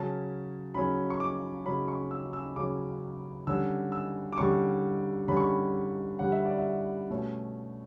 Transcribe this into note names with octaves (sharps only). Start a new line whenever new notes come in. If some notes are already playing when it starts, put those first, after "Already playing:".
Already playing: C#3 F#3 C#4 A5
C#3 F#3 C#4 B5
C#6
D6
C#3 F#3 C#4 B5
C#6
E6
E6
C#3 F#3 C#4 D6
D3 G3 C#4 E6
E6
D6
D3 G3 C#4 C#6
D3 G3 C#4 B5
C#6
B5
D3 G3 C#4 F#5
E5
D5
E5
B2 A3 C#4